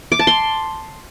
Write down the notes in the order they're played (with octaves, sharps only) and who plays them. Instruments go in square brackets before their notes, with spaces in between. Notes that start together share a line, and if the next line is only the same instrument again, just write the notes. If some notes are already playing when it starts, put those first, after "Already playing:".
[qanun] D6
A5
C6